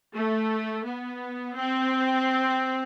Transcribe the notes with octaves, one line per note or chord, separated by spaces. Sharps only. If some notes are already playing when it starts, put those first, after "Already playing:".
A3
B3
C4